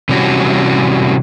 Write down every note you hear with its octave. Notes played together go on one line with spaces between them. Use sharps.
C3 E3 G3 C#4 F#4